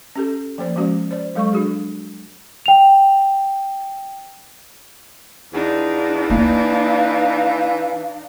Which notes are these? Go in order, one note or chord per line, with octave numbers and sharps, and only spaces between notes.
C#4 G4 A4
F3 A#3 C5 D5
F3 G#3 C#4 F#4
C5 D5
F#3 G#3 A4 F5 C#6
D4 F#4 G#4
G5 F7
E2 D4 D#4 F4
E3 A#3 E4 F5